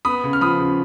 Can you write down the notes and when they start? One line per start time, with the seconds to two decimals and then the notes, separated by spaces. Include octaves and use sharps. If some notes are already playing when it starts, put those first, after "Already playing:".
0.05 B3 B5 D#6
0.24 C#3
0.33 F6
0.41 F3 B5 D#6
0.59 C#3